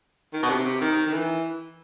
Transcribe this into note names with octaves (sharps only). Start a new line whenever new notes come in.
D#3
B2
C3
C3
D#3
D#3
E3